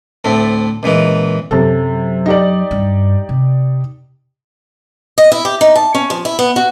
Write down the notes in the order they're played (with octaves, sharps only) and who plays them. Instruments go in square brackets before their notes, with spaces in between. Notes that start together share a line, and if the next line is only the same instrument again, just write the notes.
[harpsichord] D2 A2 A3 C4
C#2 A#2 E3 D#4
[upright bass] F#2 F#3 [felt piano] C3 A4
[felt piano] D#4 G4 D5
[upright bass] G2
C3
[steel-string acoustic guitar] D#5
E4
G4
D#4
A5
C#4
F3
E4
B3
F#4